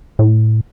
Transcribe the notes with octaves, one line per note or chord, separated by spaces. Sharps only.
A2